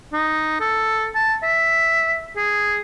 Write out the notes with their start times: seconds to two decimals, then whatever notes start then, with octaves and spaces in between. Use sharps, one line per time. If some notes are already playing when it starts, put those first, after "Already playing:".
0.13 D#4
0.61 A4
1.15 A5
1.43 E5
2.37 G#4